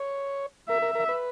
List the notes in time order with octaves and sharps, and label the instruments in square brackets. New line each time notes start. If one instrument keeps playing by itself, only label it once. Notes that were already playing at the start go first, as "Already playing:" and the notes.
Already playing: [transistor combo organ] C#5
[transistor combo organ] A#4 [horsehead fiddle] E5
[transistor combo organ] A#4
A#4
B4